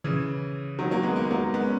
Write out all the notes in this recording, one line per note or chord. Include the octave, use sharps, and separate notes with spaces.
C#3 E3
D#3 F#3
F#3 A#3
G#3 B3
A#3
G#3
F#3 A#3
G#3 B3
C#4